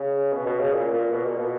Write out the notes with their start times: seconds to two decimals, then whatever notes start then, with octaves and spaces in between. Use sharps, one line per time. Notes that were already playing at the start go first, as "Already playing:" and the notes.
Already playing: C#3
0.32 B2
0.46 B2
0.59 C#3
0.73 A#2
0.93 A#2
1.13 B2
1.25 A#2
1.38 B2